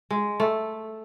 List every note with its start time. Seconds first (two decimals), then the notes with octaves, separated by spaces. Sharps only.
0.10 G#3
0.40 A3